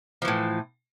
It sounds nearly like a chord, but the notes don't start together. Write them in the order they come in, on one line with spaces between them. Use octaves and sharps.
F3 E3 A2